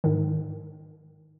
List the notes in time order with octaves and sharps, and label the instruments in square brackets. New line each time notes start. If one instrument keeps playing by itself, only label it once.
[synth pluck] G#2 D#3